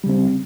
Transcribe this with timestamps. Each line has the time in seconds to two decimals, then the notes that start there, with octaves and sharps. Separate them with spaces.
0.04 G3
0.06 C#3
0.09 C4